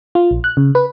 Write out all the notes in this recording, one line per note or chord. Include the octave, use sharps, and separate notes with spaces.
F4
A#1
F#6
C#3
B4